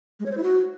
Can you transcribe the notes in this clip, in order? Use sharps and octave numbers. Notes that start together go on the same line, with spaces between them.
G#3
C#5
C5
E4
F#4